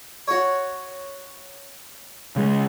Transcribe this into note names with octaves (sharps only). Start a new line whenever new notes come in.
F#4 C#5
C#3 G#3